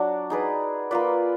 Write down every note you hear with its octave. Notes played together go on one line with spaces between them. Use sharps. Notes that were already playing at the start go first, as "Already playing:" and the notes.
Already playing: F#3 D4 F#4 D5
D#4 G#4 B4 D5
A#3 F4 B4 D5